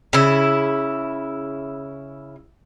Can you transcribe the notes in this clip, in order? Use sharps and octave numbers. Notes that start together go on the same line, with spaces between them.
C#3 E4